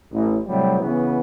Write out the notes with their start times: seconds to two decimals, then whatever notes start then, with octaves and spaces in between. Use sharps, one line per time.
0.12 A1
0.46 A2 C3 F#3 G3
0.80 C#3 E3 B3